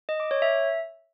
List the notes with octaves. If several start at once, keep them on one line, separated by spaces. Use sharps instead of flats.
D#5
D6
C#5
E5